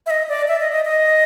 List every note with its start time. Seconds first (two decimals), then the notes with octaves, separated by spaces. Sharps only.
0.06 E5
0.10 D#5
0.29 D5
0.48 E5
0.60 D#5
0.72 D#5
0.85 D#5